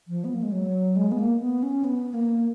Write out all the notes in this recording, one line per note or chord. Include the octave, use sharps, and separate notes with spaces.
F3
B3
A#3
G#3
F#3
G#3
B3
A#3
B3
C#4
B3
A#3